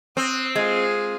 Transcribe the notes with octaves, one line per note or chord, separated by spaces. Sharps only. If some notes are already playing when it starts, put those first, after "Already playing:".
C4 D#6 F#6
G#3 F4 G#4